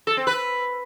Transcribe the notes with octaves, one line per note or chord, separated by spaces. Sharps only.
A4
C4
B4